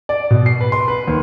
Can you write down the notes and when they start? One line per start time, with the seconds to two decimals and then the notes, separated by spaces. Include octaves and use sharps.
0.09 D5
0.30 B2
0.46 C7
0.61 B4
0.72 C6
0.88 B4
1.08 D#2